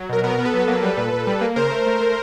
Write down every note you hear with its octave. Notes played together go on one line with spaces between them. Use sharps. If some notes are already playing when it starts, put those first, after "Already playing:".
Already playing: F#3
B2 A#4
B3 A#4
B3
A4 B4
F#3
A#3
G3
A#2
A#2
G3
A#3
C#3 A#4 C5
A3
A3
A3